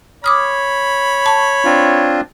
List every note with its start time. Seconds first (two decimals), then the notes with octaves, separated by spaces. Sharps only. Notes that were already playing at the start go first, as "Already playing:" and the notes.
0.24 C#5 B5 D6 D#6 F6
1.26 A5 C#6
1.65 C4 D4 F4